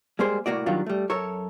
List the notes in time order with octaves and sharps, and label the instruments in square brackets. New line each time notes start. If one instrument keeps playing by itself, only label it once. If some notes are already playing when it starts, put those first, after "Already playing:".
[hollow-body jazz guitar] G3 G#3 A#3 G#4 C5
C2 A2 A#3 F#4 D5
D#3 F#3 G3 A#3 D4 F4
G3 A3
F#2 A4 A#4 C#5